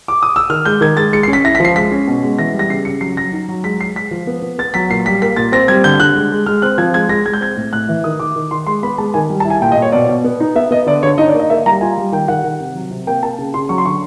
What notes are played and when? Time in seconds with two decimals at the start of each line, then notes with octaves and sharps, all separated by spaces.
0.08 D6
0.23 D#6
0.36 E6
0.50 D#3 F6
0.66 G#3 G6
0.81 D#3 G#6
0.97 G#3 A6
1.13 G#3 C#7
1.23 C7
1.28 C#4
1.33 B6
1.44 E4 A#6
1.55 B6
1.60 F3 C7
1.76 G#3 B6
1.92 C#4
2.08 B2
2.23 G#3
2.39 E3 A#6
2.54 G3
2.59 A#6
2.70 C#3 C7
2.85 C#3 C#7
3.01 F#3 C7
3.17 F#3 A#6
3.33 D#4
3.49 F#3
3.64 G#3 B6
3.80 G#3 C7
3.95 G#3 B6
4.11 F3
4.27 B3
4.42 B3
4.58 B3 A6
4.74 F#3 B6
4.90 A#2 C7
5.06 G3 B6
5.22 A#3 B6
5.36 A#2 A6
5.52 C4 A#6
5.68 G3 G#6
5.84 D3 G6
6.00 D3 F#6
6.16 G#3
6.32 G#3
6.46 G#3 F6
6.62 C4 F#6
6.78 F3 G#6
6.94 G#3 G#6
7.09 G#3 A#6
7.26 G#3 G#6
7.34 G6
7.41 C4 G#6
7.57 A2
7.73 A2 F#6
7.89 E3
8.04 D#3 D#6
8.20 D#3 D6
8.36 D#3
8.51 D#3 C6
8.67 G#3 C6
8.83 B3 B5
8.98 G#3 A5
9.14 D#3 G#5
9.30 G3
9.40 A5
9.45 E4
9.50 G#5
9.61 A#2 G5
9.72 D#5
9.76 A#2
9.82 C#5
9.92 B2 D5
10.09 B2
10.24 B3
10.40 D#4
10.55 B3 E5
10.71 B3 D#5
10.86 D3 D5
11.03 D3 C#5
11.18 D#4 D#5
11.29 D5
11.34 A#3
11.40 D#5
11.50 A#3 E5
11.66 G3 A#5
11.81 F4 G#5
11.98 G3
12.12 D#3 G5
12.28 D#3 F#5
12.44 D#3
12.60 C3
12.75 F#3
12.91 C3
13.07 A#3 G5
13.23 A#3 A5
13.38 C#3
13.54 C#3 C6
13.69 F#3 C#6
13.78 C6
13.85 D3 C#6